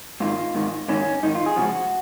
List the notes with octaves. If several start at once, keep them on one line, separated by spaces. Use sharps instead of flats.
G#2 D#3 F4
G#2 D#3
G#2 D#3 C#4
G#2 D#3 D#4
F4
G#4
C#2 C#3 F3 F#4